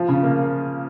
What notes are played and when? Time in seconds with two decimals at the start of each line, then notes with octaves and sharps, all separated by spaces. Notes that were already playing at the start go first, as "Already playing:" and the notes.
Already playing: F3
0.08 C#3
0.23 A#3